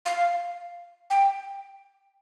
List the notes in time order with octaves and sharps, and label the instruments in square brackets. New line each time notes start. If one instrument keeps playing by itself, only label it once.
[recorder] F5
G5